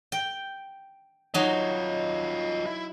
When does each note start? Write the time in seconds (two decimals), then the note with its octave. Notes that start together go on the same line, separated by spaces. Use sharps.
0.12 G5
1.34 F#3 D#4 F4 D#5
2.66 E4